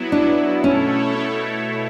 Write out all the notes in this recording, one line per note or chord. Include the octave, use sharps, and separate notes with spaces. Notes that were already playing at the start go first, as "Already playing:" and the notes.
Already playing: F#3 B3 E4
D4
B2 A3 C#4 E4 A4 C#5